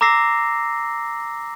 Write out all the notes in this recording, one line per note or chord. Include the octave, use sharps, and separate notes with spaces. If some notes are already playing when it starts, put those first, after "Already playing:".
A#5 D6 E6 A#6 C7